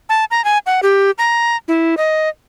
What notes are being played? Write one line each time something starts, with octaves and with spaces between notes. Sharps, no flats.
A5
A#5
G#5
F#5
G4
A#5
E4
D#5